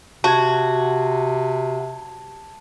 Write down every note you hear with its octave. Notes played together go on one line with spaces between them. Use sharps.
C3 F#4 A5 G#6